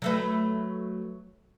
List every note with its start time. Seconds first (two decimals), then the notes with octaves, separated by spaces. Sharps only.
0.02 F#3 A3 B4